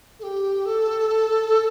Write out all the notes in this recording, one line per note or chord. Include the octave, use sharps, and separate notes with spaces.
A4
G4
A4